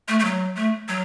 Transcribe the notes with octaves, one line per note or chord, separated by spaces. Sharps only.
A3
A3
F#3
A3
F#3